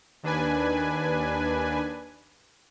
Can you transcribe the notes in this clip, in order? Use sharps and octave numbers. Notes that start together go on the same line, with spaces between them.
D#2 D4 B4 G#5